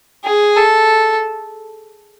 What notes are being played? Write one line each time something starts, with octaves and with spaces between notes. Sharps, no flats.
G#4
A4